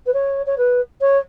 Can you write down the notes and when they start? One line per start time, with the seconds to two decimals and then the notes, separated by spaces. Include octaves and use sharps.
0.06 B4
0.13 C#5
0.46 C#5
0.58 B4
1.01 C#5